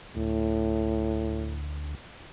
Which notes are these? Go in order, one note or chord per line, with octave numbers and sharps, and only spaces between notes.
D2 A2